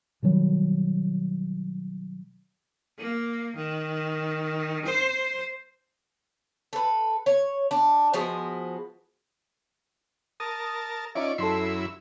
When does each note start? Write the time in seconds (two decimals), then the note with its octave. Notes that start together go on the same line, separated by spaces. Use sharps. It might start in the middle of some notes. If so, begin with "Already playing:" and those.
0.22 B2 D#3 F#3 G3
2.98 A#3
3.56 D#3
4.85 C5
6.73 A4 B4
7.26 C#5
7.71 D4
8.14 F3 G#3 B3 F#4
10.40 A#4 A5 D#6
11.15 C#4 D#4 F4 D5 E5
11.38 F#2 E4 A4 C6 C7